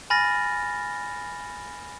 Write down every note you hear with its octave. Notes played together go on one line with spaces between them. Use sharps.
G#5 B5 F6 A6 A#6